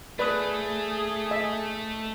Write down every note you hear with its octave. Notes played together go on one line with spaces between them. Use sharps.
A3 G#4 B4 D5 D#6
D#5 E5